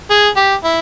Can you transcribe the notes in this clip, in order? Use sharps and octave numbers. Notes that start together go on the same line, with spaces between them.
G#4
G4
E4